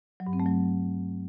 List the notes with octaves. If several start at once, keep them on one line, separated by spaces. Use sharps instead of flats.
F#3
G2
C4
A3
F#3